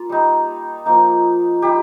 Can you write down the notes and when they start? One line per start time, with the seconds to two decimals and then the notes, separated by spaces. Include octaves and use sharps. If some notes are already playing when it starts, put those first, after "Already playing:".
Already playing: A#3 F4
0.09 G3 D#4
0.86 F3 A#3 D#4
1.62 G3 D#4 G4